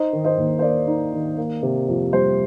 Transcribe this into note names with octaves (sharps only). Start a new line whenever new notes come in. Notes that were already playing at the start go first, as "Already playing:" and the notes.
Already playing: D#4 C5 D#5
D#3
C5 D#5
D#2
C5
A#3 D5
D#4
D#3
A#3
C3
F2
G3 C5